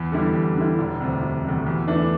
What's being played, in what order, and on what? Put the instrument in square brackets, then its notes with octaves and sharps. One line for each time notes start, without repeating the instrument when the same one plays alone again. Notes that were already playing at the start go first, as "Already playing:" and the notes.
Already playing: [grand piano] E2
D3 G3 E4
E2
D3 G3 E4
E1
D2 C3
E1
D2 C3
E2
E3 A3 D4